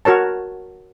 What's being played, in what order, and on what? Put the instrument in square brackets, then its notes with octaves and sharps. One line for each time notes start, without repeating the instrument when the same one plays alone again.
[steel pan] F#4 A#4 C#5 A5